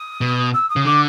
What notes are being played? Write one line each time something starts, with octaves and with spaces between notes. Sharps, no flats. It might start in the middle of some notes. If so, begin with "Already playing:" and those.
Already playing: D#6
B2
E6
D#6
C#3
D3 D6